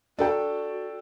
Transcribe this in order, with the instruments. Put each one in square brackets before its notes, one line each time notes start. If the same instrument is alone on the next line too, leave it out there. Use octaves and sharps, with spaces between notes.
[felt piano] D4 A4 G5 [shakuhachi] F#4